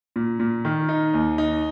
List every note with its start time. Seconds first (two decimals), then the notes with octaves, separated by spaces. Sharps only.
0.16 A#2
0.40 A#2
0.65 D#3
0.89 D#4
1.14 D#2
1.38 D#4